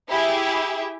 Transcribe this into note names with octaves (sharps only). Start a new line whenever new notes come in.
E4 G4 G#4 E5